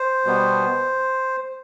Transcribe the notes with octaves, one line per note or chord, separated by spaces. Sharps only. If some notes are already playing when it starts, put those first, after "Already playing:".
Already playing: C5
B2 G3 B3